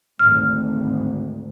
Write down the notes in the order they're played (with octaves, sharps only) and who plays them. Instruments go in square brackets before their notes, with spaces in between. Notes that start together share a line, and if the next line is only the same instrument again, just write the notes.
[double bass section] G#1 D2 [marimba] F6